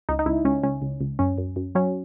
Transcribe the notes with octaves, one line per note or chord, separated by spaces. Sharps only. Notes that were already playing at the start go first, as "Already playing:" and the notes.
C#2 D#4
D#4
C#2 E4
C#2 C#4
C#2 C#4
C#2
C#2
F#2 C#4
F#2
F#2
F#3 C#4